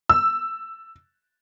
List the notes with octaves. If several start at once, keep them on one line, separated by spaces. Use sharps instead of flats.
E6